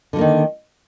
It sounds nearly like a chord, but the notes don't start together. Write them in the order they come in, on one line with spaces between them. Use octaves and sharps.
D3 G3 A#3 D#3